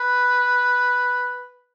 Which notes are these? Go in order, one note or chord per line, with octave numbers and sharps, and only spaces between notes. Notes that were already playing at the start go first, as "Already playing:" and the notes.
Already playing: B4